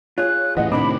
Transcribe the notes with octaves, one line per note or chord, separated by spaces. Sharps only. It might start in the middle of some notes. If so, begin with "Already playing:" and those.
F4 G#4 C#5 F#6
A2 E3 D#5 F#5
A2 C3 D#3 C4 D4 E4 B5 D6